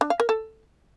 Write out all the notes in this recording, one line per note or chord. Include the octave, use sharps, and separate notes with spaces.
D4
F5
A#4
A4